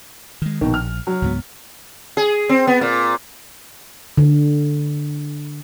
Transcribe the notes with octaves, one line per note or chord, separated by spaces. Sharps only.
D#3 G#3
A#1 B2 D#3
F6
F#3
C#2 G#2 B3
G#4
C4
B3
A#2
D3